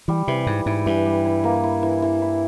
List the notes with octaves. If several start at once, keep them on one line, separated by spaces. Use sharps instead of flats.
E3 G3
C3 E3
G#2 E3
G#2 E4
G2 E3
G3
E4
A#3
E4
E3
E3
E4